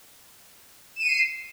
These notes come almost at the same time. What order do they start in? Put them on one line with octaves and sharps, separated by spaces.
E7 D#7 C#7 C7